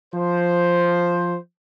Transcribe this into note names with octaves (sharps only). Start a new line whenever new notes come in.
F3 C5